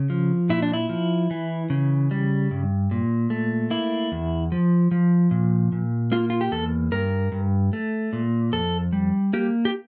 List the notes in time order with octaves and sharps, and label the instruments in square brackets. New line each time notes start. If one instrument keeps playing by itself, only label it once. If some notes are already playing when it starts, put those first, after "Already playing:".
Already playing: [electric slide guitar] C#3
F3
A#2 E4
D4
E4
F3
E3
C#3
G3
G2
A#2
A3
A#3 E4
E2
F3
F3
A#2
A#2
A#3 F4
F4
G4
E2 A4
G2 A#4
G2
A3
A#2
F2 A4
G3
A#3 G4
G4